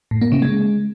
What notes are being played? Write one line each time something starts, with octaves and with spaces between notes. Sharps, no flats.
A2
A#3
C#3
G#3